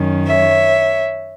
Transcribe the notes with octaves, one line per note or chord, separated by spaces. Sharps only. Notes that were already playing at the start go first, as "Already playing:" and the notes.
Already playing: F#2 D#3 F#3 C#4
C#5 E5